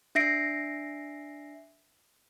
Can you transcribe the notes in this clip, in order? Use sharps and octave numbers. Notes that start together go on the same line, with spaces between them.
D4 E5 A#6 C7 D7